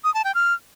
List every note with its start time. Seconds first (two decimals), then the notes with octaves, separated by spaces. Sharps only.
0.04 D#6
0.14 A5
0.25 G5
0.35 F6